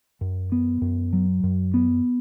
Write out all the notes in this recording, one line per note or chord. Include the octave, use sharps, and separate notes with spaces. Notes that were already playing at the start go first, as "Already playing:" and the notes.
F#2
B3
F#2
F#3
F#2
B3